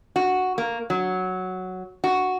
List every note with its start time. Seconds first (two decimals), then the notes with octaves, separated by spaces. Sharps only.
0.16 F#4
0.58 A#3
0.90 F#3
2.04 F#4